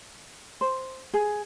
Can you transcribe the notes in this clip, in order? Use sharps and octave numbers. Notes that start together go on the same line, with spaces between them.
C5
G#4